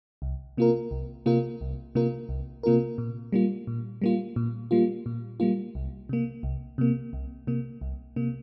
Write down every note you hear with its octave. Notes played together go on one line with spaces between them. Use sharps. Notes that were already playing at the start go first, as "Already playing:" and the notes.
C2
C3 A#3 F4 A#4
C2
C3 A#3 F4 A#4
C2
C3 A#3 F4 A#4
C2
C3 A#3 F4 A#4
A#2
G3 A#3 F4
A#2
G3 A#3 F4
A#2
G3 A#3 F4
A#2
G3 A#3 F4
C2
C3 A#3
C2
C3 A#3
C2
C3 A#3
C2
C3 A#3